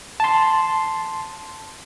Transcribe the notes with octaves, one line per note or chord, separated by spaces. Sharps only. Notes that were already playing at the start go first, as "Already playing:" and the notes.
A5 C6